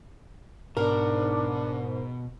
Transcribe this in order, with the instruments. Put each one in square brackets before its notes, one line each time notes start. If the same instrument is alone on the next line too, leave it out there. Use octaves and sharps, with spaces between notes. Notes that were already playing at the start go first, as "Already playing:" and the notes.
[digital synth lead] G#2 [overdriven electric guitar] B2 [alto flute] D4 [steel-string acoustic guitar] A#4